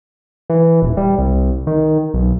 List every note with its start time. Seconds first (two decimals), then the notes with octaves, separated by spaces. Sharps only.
0.50 E3
0.82 D#1
0.97 G3
1.19 C2
1.67 D#3
2.14 B1